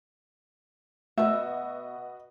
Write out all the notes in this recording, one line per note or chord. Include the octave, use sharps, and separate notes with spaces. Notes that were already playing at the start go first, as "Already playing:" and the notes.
B2 A3 F#4 B4 D#5 E5